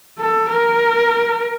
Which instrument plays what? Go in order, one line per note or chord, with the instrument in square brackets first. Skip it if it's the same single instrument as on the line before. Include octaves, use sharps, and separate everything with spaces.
[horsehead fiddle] A4
A#4